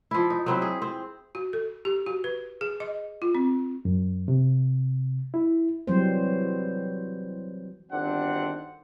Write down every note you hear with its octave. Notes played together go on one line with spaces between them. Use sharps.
F3 E4
D#4
F#3 C4 E4
G#4
C4
F#4
A4
G4
F#4
B4
G#4
D#5
F4
C4
F#2
C3
E4
E3 F#3 G3 C4 C5
G1 D#3 C4 D4 F#4 F#5